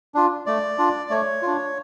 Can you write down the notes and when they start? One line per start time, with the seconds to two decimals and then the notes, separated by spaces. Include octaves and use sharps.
0.14 D4 F4
0.46 A3 D5
0.78 D4 F4
1.10 A3 C#5
1.42 D4 F4